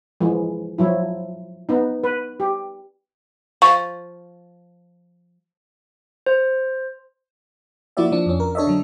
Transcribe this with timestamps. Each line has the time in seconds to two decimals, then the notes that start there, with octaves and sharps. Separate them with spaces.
0.21 E3 F3 G#3
0.78 F3 F#3 E4
1.69 B3 D#4
2.04 B4
2.40 G4
3.62 F3 C#6
6.26 C5
7.97 F3 A#3 E4 F#4 D5 E5
8.12 F3 D4
8.26 F2 C#4
8.40 A#4
8.55 D4 A4 C#5 D#5 E5
8.67 D3 F#3